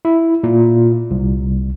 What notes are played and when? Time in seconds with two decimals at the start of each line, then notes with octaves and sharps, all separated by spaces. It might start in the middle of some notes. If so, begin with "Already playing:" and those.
0.05 E4
0.44 A#2
1.11 C2